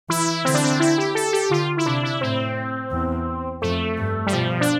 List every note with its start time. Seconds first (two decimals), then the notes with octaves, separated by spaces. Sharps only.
0.09 E3 E4
0.45 D3 C4
0.54 D4
0.64 C4
0.80 E4
0.98 G4
1.15 A4
1.33 G4
1.50 D3 F4
1.78 E4
1.85 C3 D4
2.03 E4
2.21 A2 C4
2.92 E2
3.62 F2 A3
3.98 G2
4.27 G3
4.32 B2 F3
4.61 D4